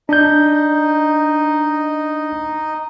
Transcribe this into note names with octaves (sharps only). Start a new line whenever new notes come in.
D4 D#4 D#5 G6